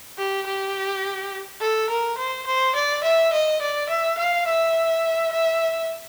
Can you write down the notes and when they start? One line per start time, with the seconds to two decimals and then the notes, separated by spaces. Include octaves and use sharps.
0.18 G4
0.47 G4
1.61 A4
1.90 A#4
2.18 C5
2.46 C5
2.75 D5
3.03 E5
3.33 D#5
3.61 D5
3.89 E5
4.18 F5
4.47 E5
5.32 E5